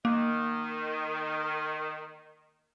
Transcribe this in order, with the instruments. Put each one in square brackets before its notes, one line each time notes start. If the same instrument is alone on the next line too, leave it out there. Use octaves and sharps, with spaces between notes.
[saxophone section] D#3 [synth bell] A#3